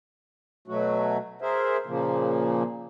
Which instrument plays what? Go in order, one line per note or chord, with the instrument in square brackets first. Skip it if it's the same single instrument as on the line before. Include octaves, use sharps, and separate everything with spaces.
[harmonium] B2 F#3 A3 F#4
G#4 A#4 C5 E5
A#2 C#3 F3 A#3